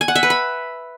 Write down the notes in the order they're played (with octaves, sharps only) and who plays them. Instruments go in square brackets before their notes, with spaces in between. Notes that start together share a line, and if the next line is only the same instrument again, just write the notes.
[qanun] G#5
F#5
E5
B4
B5